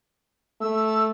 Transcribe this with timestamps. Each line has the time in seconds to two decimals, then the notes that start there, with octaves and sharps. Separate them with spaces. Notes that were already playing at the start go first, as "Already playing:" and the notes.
0.61 A3 E6